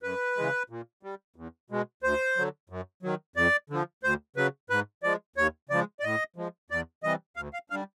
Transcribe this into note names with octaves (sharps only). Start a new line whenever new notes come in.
F#2 B4
C#3 E3 G#3
A#2
G3
E2
B2 G#3
D2 C5
D3 F#3
F#2
D#3 F#3
F2 D5
D3 F3
D2 C5
C#3 F#3 B4
G#2 B4
F3 G#3 D5
D#2 C#5
C#3 F3 G#3 D5
D5
A2 D#5
F3 G#3
E2 D5
C3 E3 G3 D#5
D2 F5
F5
D3 G3 F5